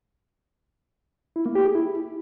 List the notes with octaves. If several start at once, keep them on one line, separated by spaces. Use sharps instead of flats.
E4
A#3
G4
G#4
E4